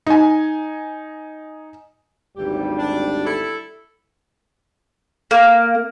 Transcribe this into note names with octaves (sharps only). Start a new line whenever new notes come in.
D#4 G#5
G#1 D2 G#2 E3 G3 G4
D4
E4 A4
A#3